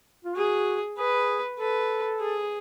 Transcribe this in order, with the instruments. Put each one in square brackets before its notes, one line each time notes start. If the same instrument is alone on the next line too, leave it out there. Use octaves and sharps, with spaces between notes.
[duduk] F4
[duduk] F#4 [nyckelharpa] G#4
[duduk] G#4 [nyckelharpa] B4
[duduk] A4 [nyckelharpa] B4
[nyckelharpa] G#4